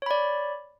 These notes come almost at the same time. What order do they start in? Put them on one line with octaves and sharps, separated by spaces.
C#5 B5 D5